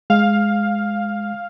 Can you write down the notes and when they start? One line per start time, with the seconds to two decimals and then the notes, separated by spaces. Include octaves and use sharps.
0.10 G#3 F5